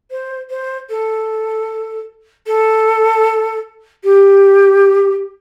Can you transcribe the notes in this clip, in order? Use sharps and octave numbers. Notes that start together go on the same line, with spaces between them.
C5
C5
A4
A4
G4